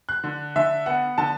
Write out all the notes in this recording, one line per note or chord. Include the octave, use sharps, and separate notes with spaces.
F#6
D3
D3 E5
B3 F#5
D3 A5